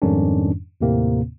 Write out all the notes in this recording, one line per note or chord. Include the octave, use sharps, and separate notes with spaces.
F2 G#2 D#3 G3 C#4 D4
D#2 A2 C3 A#3 C4